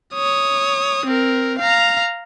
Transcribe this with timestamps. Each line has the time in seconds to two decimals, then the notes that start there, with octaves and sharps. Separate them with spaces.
0.14 C#5 D#6
1.06 C4 A#4
1.59 F5 A#5